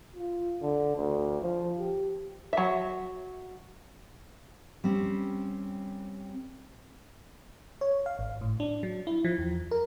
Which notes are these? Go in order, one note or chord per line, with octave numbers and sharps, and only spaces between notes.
F4
D3
D2
F3
G4
F#3 E5
G3 C4 C#4
C#5
F5
G#1
A2
D4
F#3
E4
F3
E2
A#4